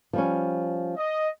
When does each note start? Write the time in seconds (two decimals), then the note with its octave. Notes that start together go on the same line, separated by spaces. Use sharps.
0.13 F3 G3 C#4
0.97 D#5